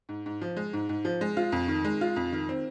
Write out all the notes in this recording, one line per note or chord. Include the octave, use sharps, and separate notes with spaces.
G#2
G#2
F3
G#3
G#2
G#2
F3
G#3
F4
F2
D#3
G#3
F4
F2
D#3
C4